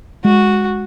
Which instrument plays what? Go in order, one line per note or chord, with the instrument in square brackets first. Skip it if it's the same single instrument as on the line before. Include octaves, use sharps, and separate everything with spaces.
[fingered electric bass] G#3 [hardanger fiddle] F#4